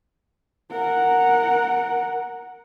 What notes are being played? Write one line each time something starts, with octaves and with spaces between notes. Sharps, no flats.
A#4 F#5